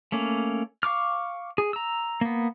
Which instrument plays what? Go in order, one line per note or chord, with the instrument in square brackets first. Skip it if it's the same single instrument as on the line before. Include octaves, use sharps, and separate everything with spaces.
[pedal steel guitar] A3 A#3 C#4
F5 C#6 D6 F6
G#4
A#5 E6
A#3 B3